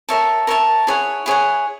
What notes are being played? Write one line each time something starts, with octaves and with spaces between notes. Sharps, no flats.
A#4 C#5 E5 A5
A#4 C#5 E5 A5
E4 G#4 C#5 F#5
E4 G#4 C#5 F#5